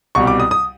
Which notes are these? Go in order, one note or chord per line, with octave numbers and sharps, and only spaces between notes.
C2 B2 G3 C#6
D6
D#6
D#6